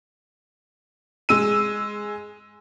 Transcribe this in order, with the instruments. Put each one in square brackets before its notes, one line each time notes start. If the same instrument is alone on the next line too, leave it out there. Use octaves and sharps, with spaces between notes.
[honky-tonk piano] G#3 E6 D#7